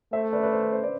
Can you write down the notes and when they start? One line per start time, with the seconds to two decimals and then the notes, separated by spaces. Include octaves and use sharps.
0.13 A3 C5 E5
0.33 B4 D5
0.43 B4 D5
0.53 C5
0.62 B4
0.73 C5
0.83 B4 D5